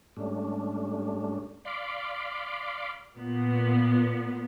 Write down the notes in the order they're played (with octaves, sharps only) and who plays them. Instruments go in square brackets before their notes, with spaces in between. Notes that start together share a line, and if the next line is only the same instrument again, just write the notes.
[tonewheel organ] G#2 G3 A3 C#4 D4
D5 F5 B5 C6 D6
[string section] A#2 B3